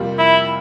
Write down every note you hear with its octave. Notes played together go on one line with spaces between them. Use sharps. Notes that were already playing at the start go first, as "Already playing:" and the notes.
Already playing: F2 C3 G3 A#3 F4
E4